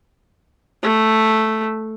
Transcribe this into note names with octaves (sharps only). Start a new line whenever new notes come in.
A3